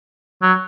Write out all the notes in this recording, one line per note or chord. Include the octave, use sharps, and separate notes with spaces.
F#3